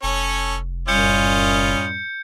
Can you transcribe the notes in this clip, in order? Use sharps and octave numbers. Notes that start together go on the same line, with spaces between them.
F1 C#4 A4 C#5
F#2 A2 G3 C#4 F4 D#5 G6 C#7